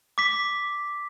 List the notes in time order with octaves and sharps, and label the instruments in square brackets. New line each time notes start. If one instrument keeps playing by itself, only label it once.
[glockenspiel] D6 B6